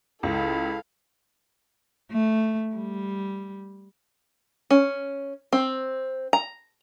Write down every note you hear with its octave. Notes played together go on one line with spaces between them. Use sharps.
C#2 E4 A4 F5
A3
G3
C#4
C4
A#5